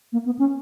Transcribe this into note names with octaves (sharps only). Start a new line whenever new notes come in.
A#3
B3
C#4